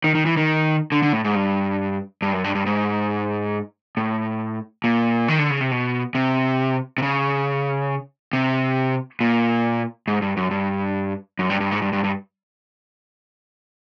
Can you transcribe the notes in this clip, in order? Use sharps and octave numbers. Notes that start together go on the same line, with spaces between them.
D#3
D#3
E3
D#3
D3
D3
A2
G#2
G2
G2
F#2
G2
G2
G#2
A2
A#2
D#3
D3
C#3
C3
B2
C3
C3
C#3
C3
A#2
G#2
G2
F#2
G2
F#2
G2
G2
G#2
G2
G2
G2